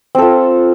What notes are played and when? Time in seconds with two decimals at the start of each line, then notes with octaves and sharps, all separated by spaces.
0.15 C4
0.18 A4
0.22 F4